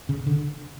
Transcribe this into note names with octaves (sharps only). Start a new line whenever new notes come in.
C#3
D3